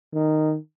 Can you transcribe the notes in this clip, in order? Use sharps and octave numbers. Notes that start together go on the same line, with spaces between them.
D#3